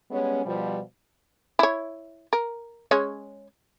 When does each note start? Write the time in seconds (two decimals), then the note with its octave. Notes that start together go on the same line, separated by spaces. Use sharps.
0.11 G3 G#3 B3 C#4
0.46 B2 F3 G3
1.59 E4 C#5
2.33 A#4
2.91 G#3 C#4 C#5